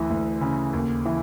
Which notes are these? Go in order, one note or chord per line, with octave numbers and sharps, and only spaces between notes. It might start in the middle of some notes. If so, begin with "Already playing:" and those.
Already playing: D2 E3
D2
C#3
D#2
E3